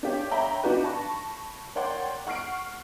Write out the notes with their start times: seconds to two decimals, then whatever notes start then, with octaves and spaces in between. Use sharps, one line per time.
0.03 D4 G4 C#5
0.31 C#5 E5 G5 A#5 B5
0.63 D4 D#4 F#4 G4 B4
0.84 A5 B5 C#6 A#6
1.75 A#4 C#5 D5 F#5 G5 C6
2.27 F#5 C#6 F6 C7 D7